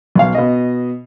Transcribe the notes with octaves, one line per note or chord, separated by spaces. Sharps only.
B1 F5
B2 D#5